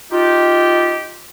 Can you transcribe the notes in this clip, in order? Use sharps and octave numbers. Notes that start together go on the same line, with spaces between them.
D#4 F4 G4